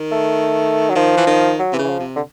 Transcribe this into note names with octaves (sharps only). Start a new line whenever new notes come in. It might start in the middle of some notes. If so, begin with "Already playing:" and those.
Already playing: D#3
A3
F#3
D#3 F3
E3
D#3
F#3
C3 E3
C#3
E3
F3
C3
D3